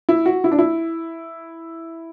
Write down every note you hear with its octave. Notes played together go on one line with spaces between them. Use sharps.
E4
F#4
E4
D4
E4